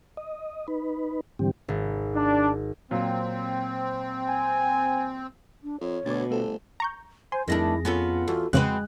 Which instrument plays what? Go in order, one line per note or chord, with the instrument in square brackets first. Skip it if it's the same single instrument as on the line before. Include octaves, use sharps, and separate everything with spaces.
[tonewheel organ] D#5
D#4 B4
G#2 D3 E3 G3 C4 G4
[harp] G#1
[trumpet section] D4
[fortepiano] A#2 F#3 [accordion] C4
[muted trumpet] G#5
[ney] D4
[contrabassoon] F2 [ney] C#5
[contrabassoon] D2 [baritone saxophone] B2 [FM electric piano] D6 G#6 A6
[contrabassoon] G1 [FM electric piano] A3 A4 C5 [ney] D4
[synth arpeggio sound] A#5 C#6 G6
[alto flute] C5 [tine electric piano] G#5 [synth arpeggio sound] C6
[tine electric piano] F2 G#4 A#6 [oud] D#3 A3 D4 [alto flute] E4
[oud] B3 C#4 A4 [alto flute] F4
[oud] E2 [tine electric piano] F#4 A4
[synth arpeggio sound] F2 C#3 [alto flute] G#3 [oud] C4 F#4 B4 [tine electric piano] F#6